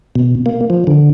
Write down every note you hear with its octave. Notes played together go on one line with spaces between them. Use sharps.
B2
A#3
F3
D3